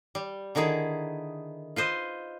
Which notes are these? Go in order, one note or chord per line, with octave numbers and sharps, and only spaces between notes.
G3
D3 D#3 D#4 E4 G#4
F4 B4 C5 D#5